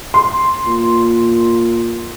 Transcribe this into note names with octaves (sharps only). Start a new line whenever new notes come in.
C6
A#2